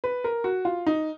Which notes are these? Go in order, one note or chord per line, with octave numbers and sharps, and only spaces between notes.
B4
A#4
F#4
F4
D#4